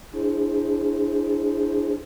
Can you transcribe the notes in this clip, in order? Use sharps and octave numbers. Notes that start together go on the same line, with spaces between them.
D4 E4 G#4 C5